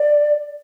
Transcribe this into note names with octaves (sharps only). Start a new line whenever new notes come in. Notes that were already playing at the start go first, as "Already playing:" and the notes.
Already playing: D5